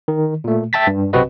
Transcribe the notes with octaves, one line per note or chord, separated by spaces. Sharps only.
D#3
A#2 A3
E5 G5 A5 A6 B6
G2
B1 C3 C4 F#4 B4 D#5